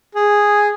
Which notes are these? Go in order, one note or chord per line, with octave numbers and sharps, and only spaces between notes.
G#4